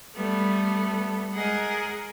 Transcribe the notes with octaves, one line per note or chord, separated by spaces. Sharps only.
G3 A3 B3 A4
G#3 G#4 A#4 D#5 F#5 G#5